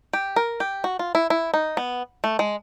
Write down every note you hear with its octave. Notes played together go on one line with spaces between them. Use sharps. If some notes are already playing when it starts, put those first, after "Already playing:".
G4
A#4
G4
F#4
F4
E4
E4
D#4
B3
A3
G#3